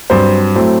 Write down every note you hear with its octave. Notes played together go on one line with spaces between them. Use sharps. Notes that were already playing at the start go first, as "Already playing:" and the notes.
G2 F#3 C4 C5
A2 F#3 A3 C4